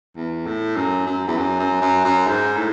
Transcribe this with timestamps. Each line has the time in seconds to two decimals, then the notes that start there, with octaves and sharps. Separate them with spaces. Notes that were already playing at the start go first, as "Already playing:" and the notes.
0.17 E2
0.46 A2
0.76 F#2
1.06 F#2
1.28 E2
1.37 F#2
1.59 F#2
1.82 F#2
2.05 F#2
2.27 G#2
2.57 A2